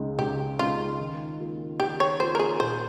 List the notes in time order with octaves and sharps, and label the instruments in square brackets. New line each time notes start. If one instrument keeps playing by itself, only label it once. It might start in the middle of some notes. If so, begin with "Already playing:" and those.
Already playing: [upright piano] C#2 C#3 G#3 D#4
[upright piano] C#2 [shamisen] G4
[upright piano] C#3 G#3 D#4 [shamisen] F4
[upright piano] D#3
A#3 F4
[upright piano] D#3 [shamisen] G4
[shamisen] C#5
[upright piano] A#3 F4 [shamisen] C5
[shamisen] A#4
G#4
[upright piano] A#2 [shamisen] C5